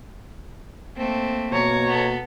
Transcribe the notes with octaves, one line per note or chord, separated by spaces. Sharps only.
A3 A#3 C4
B2 C#5 A#5
B3 A4